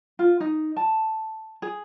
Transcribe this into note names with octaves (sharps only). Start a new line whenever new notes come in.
F4
D#4
A5
G#4